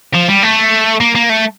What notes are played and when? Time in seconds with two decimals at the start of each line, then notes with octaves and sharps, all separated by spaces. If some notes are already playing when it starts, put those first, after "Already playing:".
0.14 F3
0.28 G3
0.43 A3
1.01 A#3
1.15 A#3
1.29 A3